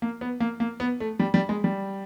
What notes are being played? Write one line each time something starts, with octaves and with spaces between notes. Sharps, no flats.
A#3
B3
A#3
A#3
B3
A3
G3
G3
G#3
G3